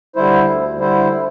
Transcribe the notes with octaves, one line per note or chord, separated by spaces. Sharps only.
D3 G3 E4 C5
D2
D3 G3 E4 C5